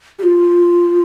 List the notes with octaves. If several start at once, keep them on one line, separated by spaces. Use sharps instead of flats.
G4
F4